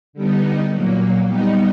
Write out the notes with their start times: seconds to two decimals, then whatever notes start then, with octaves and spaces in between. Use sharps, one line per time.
0.13 D3 G3 B3 D#4
0.70 A#2 F#3 A#3
1.26 G3 B3 D#4